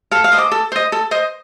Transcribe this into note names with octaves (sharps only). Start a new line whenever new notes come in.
A4 F5
F5
C5 D#5
D6
A4
C5 D#5
A4
C5 D#5